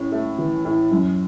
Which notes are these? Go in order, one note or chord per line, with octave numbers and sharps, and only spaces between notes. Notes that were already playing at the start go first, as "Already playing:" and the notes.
Already playing: A2 C#4
A3
E3
A2
F#2